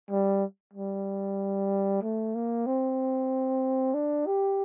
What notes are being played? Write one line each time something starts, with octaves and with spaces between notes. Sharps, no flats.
G3
G3
A3
A#3
C4
D4
G4